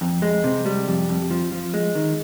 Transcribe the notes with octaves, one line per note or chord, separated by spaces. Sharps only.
F2
G#3
C3
G3
F2
F2
F3
F3
G#3
D#3